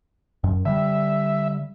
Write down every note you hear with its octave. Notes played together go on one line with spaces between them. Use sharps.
F#2
D3 G3 E5